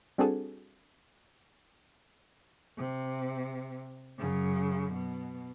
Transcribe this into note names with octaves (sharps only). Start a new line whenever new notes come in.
G3 C4 D4 F#4 G#4 A4
C3
F#2 C#3
B2